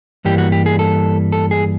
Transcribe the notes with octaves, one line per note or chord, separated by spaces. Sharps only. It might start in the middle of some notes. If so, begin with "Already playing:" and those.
G2 E3 G3 A#3 G4
F#4
G4
G#4
A4
A4
G#4